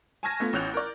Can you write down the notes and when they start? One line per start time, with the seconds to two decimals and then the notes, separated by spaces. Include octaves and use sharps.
0.23 G#5 A5 C#6 F6 G#6 A#6
0.40 A3 B3 F4
0.53 A1 C#4 F#6 G6 F7
0.74 A#4 D5